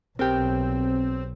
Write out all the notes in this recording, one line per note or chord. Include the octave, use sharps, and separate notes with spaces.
B1 C4 G4 A#4